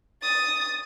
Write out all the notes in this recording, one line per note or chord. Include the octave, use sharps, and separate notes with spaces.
D#6 A6